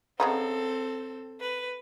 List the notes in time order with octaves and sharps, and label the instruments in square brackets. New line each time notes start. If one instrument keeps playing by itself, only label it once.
[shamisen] C#3 B3 D#4 [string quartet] C4 A4
[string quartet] B4